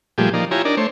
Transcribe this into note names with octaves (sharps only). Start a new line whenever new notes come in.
A#2 F3 G3 A3 G4 G#4
F3 A#3 D#4 D5
E4 F4 G4 C#5 G#5 A#5
D4 D#4 A#4 D5
A3 C5 C#5